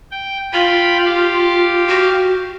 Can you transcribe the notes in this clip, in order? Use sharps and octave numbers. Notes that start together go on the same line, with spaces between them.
G5
F4 F5 G5 B5
G4 F5
F#4